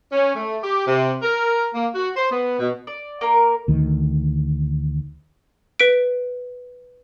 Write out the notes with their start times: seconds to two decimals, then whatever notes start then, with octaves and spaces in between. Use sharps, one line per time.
0.12 C#4
0.36 A3
0.63 G4
0.87 C3
1.22 A#4
1.74 A#3
1.95 F#4
2.16 C5
2.31 B3
2.60 B2
2.87 D5
3.21 A#3 A#4
3.68 D2 D#3
5.80 B4 B6 D7